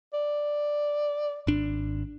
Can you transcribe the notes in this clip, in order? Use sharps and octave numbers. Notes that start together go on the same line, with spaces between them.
D5
G#1 D4